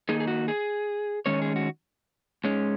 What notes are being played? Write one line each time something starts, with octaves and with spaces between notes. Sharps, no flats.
D#3 A#3 D#4 G#4
G#4
F#4
G#4
D#3 G#3 C#4 C#5
G#4
F#4
G#2 G#3 C#4